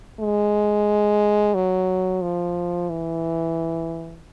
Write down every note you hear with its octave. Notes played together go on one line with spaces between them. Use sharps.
G#3
F#3
F3
E3